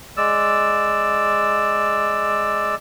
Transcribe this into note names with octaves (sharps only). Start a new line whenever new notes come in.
G#3 D5 E6